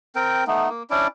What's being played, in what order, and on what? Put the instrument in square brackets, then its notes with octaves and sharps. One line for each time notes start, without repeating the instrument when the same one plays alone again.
[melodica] C4 A#4 G5
A3 B3 D#4
A#3
C#4 D4 E4 D5